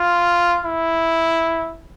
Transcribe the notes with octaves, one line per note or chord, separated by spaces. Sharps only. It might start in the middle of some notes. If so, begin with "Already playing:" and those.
Already playing: F4
E4